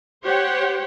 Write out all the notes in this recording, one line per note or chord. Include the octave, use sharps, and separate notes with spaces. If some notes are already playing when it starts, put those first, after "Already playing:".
G4 C5 C#5 F#5 G5